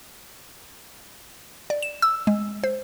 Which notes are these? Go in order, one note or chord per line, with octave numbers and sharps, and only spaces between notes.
D5
E7
E6
G#3
C5